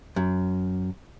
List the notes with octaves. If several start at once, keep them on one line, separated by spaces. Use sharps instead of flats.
F#2